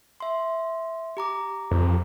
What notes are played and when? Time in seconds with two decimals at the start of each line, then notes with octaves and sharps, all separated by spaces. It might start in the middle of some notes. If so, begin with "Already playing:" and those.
0.20 E5 C6
1.17 G4 A#5 D6
1.71 F2